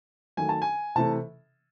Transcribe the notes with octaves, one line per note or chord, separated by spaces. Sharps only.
D#3 F#3 A3 G#5
A5
G#5
C3 E3 A3 A5